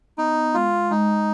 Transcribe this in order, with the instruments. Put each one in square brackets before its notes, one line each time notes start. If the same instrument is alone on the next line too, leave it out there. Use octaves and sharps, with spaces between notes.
[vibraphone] B3 [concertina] D#4
[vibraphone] G#3 [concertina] F4
[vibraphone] G#3 [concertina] D#4